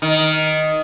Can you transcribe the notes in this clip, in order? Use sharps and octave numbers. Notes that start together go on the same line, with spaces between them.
D#3